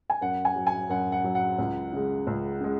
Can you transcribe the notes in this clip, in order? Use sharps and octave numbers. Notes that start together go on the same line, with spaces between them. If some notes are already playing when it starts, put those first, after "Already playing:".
G#5
F#2 F#5
G#5
F#3
G#5
F#2 F#5
F#5
F#3
F#5
C#2
C#3 G#3
C#2
C#3 G#3